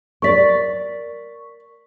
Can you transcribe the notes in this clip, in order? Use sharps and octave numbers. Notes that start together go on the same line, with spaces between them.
A#4 D5 C#6 B6